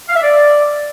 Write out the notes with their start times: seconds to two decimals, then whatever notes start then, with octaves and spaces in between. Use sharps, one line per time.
0.08 F5
0.15 E5
0.22 D5